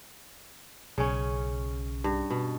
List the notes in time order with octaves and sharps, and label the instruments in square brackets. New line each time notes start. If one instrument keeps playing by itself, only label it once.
[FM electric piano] B1 [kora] C#3 C#4
[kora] G2
B2